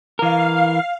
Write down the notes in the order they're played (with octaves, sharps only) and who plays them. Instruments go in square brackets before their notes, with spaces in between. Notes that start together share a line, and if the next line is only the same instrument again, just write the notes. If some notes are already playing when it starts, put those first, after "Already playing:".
[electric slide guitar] E3 A#4 [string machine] F5